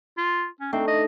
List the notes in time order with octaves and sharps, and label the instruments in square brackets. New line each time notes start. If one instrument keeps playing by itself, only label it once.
[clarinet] F4
C#4
[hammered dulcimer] A3 D4 D#4 [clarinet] C4
[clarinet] D#5